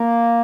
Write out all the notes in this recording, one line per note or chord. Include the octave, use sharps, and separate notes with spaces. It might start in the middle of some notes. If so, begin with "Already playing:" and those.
Already playing: A#3